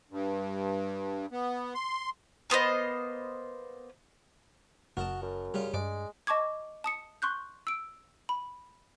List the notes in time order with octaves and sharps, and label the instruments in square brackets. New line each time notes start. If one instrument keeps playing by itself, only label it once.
[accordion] G2
B3
C6
[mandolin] A#3 B3 C5 D#5
[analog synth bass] F#1 [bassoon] F#4 [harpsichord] A#4 D#5 A5
[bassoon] F#2
[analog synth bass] G2 [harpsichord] C#3 G3 F4
[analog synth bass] G2 [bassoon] G#3 [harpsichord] D5 D6
[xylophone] D#5 A5 C#6 D6 G#6
A5 D#6 C#7
C6 C#6 F#6 G6
E6 D7
B5